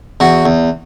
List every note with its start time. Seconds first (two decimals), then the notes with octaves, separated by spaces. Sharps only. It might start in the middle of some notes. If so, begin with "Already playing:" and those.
0.20 E2 F#4
0.45 E2